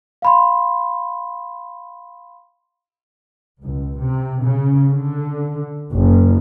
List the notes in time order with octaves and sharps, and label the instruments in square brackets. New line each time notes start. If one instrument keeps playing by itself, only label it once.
[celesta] F5 B5 C6
[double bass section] C#2
C3
C#3
D3
F#1